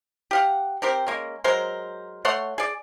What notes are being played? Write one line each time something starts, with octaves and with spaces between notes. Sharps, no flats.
G4 F5 F#5
C4 G4 A#4 C5
G#3 A#3 C#4
F#3 G#3 A#4 C5
A3 C#5 F#5 C6
G#4 D5